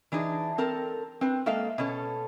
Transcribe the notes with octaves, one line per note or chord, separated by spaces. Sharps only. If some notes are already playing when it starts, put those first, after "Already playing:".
E3 D4 D#4 G#4
C4 A4 A#4
C4 B4
G#3 A#3 A4 E5 F5
B2 C#4 A4